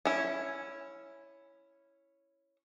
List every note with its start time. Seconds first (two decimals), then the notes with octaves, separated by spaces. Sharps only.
0.05 C#4 E4